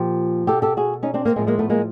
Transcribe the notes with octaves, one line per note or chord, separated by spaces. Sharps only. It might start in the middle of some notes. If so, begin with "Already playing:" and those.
Already playing: A#2 F3 G4
B2 G4 A4
G4 A4
F#4 G#4
C#4 D#4
C4 D4
A#3 C4
A2 F3 G#3 A#3
G#3 A#3
A3 B3
G#3 A#3